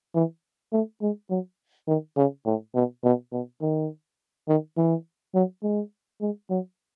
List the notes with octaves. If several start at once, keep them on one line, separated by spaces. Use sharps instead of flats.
E3
A3
G#3
F#3
D#3
C#3
A2
B2
B2
B2
D#3
D#3
E3
F#3
G#3
G#3
F#3